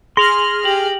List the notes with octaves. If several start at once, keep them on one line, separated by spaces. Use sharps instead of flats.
G#4 C6 F6 A#6 F7 F#7
G4 F#7